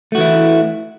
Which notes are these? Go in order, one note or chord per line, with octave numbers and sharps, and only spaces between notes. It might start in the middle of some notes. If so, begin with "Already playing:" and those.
E3 A3 E4 F#4